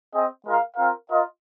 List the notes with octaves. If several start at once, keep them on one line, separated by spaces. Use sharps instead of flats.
C4 G#4 D#5
G#3 F4 A#4 F5
C4 F4 A#4 F5
F4 A#4 D#5